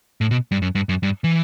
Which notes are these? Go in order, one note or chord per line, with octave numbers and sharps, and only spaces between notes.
A2
B2
G2
F#2
G2
F#2
G2
E3